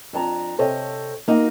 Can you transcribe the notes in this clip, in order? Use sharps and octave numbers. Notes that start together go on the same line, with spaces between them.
F2 D4 A5 A#5
C3 A4 C5 C#5 D#5
A#3 D#4 F#4